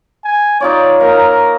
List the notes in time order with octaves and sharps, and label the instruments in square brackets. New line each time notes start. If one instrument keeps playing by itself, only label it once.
[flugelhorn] G#5
[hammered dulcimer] D#4 F4 C#5 [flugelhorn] D5
[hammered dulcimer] A#3 F#5 [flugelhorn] A#4